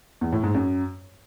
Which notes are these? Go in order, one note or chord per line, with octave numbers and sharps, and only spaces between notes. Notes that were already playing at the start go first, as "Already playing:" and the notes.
E2
A2
G#2
F#2